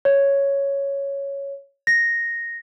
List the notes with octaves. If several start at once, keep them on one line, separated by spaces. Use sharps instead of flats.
C#5
A#6